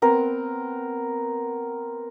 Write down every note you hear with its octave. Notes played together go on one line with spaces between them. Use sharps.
B3 C4 A#4